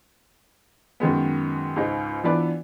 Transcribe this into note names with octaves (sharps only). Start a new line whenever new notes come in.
F#2 D#3 G#3 B3
C#2 G#2 D#4
E3 B3 D4 F4 B4 D5